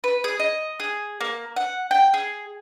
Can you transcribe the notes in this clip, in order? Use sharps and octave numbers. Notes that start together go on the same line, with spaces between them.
B4
G#4
D#5
G#4
A#3
F#5
G5
G#4